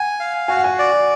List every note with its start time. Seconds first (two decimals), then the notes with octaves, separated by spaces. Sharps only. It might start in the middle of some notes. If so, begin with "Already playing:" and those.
Already playing: F#5 G#5
0.20 F5
0.48 F#4 G#5
0.57 F#5
0.64 G#5
0.79 D5